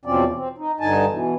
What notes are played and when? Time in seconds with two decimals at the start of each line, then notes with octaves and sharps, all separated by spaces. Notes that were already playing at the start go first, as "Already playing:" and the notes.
0.05 E2 B2 F3 C4 C#4 D5
0.34 C4
0.58 D#4
0.80 G2 D3 D#4 G#5 A5
1.09 B2 E3